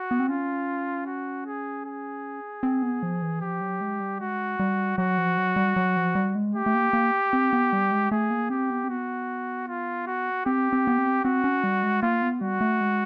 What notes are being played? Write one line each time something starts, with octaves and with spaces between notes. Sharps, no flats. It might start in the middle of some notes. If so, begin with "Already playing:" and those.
Already playing: F#4
B3
C4
C#4 F4
F#4
G#4
G#4
C4
B3
F3
E3
F3 G4
F#3
G#3
G3
G#3 F#4
G3
F#3 F#4
F3
F#3
G3
F#3
F3
G3
G#3
A3 G4
A3
A#3
A#3
C4
B3
G3
G#3
A3 G#4
A#3
C4 G4
B3
C4
B3 F#4
F4
F#4
C4 G4
C4
B3
C4
C4 F#4
C#4
G3
G#3
A#3 F4
B3
G3 F#4
A3
G#3